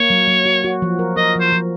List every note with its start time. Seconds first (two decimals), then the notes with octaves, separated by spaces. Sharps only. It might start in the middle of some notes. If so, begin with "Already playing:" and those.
Already playing: A#3 C#5
0.10 F#3
0.28 F#3
0.45 F#4
0.64 F#4
0.82 F3
0.99 A#4
1.17 A#4 D#5
1.35 F3 C5
1.52 F3